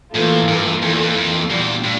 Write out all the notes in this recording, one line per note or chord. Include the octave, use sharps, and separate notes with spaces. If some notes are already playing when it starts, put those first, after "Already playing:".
A2 E3 A#3 F4 A4
G2
F2 E3 A#3 F4 A4
E2
F2
F2
E2 A#2 G3 D4 F4
A2